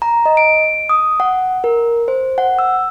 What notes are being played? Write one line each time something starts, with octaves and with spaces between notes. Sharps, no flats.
A#5
D#5
D7
D#6
F#5
A#4
C5
F#5
E6